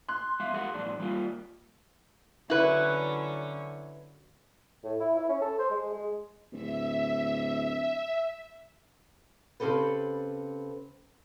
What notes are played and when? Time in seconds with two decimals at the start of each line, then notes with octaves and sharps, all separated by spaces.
0.09 C6 F#6
0.40 G#3 E5 F5
0.54 G#4 F5 F#5
0.74 E2 A2 D4
1.00 G3 A#3 F4
2.50 D3 F#3 C#4 E4 B4
4.84 A2
5.00 E4
5.16 E4
5.29 C#4
5.42 A4
5.59 C5
5.71 G#3
5.93 G#3
6.52 D1 E5
9.60 C#3 C4 G4 A4 B4